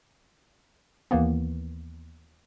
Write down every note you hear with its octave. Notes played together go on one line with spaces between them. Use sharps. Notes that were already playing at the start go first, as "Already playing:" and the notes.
D#2 E3 A#3 B3